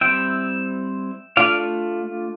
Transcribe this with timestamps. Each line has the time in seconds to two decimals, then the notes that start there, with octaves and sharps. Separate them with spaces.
0.01 G3 C4 E4 E5 G5
1.37 A3 D4 F4 D5 F5